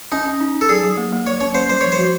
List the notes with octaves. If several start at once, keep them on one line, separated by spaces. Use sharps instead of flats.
C#4 D#4
C#4
D#4
D#4
A4
F#3 G#4
F#3
A#3
A#3
F#3 C#5
C#4 C#5
A#3 C5
G3 C5
F3 C#5
C5
F#4